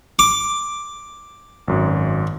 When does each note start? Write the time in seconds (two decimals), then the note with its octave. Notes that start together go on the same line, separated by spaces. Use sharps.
0.19 D6
1.68 G#1 F#2